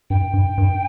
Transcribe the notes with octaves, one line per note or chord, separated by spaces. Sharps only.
G2 G5
G2
G2